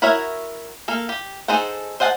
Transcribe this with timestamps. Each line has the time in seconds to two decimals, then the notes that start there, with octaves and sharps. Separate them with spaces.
0.02 E4 F#4 A#4 C#5 E5
0.88 A#3 A4 F5
1.09 G4
1.48 D#4 G#4 A4 C5 F#5
2.00 C5 D#5 F#5 G#5 A5